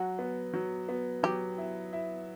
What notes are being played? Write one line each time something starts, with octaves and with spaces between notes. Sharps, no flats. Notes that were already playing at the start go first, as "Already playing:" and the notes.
Already playing: F#3 F#4
B3
F#3
B3
F#3 G4
E4
E4